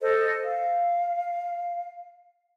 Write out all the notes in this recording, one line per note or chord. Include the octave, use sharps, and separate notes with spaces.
A4 C5 D#5
F5